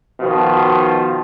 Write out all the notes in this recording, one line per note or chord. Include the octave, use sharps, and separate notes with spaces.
B2 D#3 F3